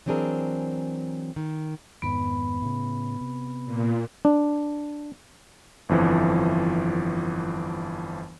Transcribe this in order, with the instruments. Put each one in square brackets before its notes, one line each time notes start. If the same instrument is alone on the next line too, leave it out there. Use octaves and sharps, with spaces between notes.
[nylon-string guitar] E3 F#3 C4 D4 G#4 A#4
D#3
[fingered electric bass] F2 G#2 D#3 [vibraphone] B3 B4 B5
[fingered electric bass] A2 C#3
C3
[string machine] A#2
[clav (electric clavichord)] D4
[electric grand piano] G1 F2 E3 F3